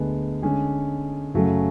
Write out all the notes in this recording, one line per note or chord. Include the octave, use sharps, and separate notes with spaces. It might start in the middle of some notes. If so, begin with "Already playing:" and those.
Already playing: D2 D3 G#3 B3
D3 G#3 C#4 G#4
F#2 C#3 F#3 A3 C#4